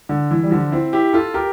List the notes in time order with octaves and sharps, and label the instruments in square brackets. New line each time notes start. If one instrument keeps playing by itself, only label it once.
[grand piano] D3
E3
G3
D3 F3
C4 E4
E4 G4
F4 A4
G4 A#4